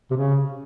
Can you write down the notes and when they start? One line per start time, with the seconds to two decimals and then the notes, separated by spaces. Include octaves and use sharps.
0.11 C3
0.16 C#3